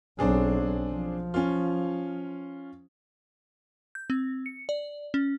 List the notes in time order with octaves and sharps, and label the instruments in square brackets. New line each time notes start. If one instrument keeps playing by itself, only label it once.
[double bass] B1 F#3 [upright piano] C4 D4 G#4
[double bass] F3
[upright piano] C#4 F4
[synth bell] G6
C4
C#7
D5
C#4